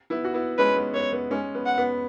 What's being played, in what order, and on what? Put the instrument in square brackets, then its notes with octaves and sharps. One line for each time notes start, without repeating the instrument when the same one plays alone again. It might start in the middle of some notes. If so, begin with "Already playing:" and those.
[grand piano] B3 E4
F#4
B3 E4
[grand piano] G#3 C#4 [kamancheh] B4
[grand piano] B3
[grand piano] B3 [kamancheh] C#5
[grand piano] B3
G#3 C#4
B3
[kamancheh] F#5
[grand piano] B3